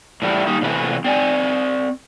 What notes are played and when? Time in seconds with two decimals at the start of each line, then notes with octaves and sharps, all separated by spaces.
0.22 A2 E3 G3 E4
0.47 G3 A#3 D#4
0.61 A2 C3 E3 B4
1.05 C4 D5 G#5